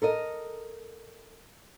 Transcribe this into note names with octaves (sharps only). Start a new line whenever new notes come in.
A4 A#4 D#5